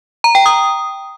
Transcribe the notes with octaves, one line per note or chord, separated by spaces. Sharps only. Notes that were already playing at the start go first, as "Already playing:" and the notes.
A#5
G5
D#6